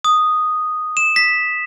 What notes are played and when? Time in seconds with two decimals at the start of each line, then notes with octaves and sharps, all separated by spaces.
0.05 D#6
0.97 E7
1.16 B6